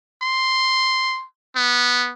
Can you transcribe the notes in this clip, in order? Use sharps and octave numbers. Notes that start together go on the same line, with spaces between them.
C6
B3